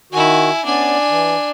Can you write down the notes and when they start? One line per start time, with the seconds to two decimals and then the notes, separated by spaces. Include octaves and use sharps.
0.12 D#3 E4 F#4 G#5
0.65 B3 C#4 D4 D5 G#5
1.10 E3